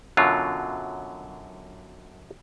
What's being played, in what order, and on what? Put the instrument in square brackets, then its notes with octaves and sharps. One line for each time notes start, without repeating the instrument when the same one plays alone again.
[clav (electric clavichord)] F#2 B2 D3 F#3 F4